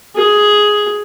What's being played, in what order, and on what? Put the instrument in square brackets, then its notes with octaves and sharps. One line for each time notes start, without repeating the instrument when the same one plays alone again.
[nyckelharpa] G#4